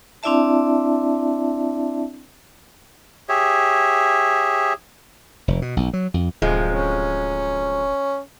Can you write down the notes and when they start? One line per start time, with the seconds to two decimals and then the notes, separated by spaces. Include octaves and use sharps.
0.23 C4 D4 E4 D5 E5 A5
3.29 G4 G#4 C#5 E5
5.48 F1
5.62 B2
5.77 B1
5.93 F#3
6.14 F2
6.42 D1 C3 F3 G#3
6.71 C#4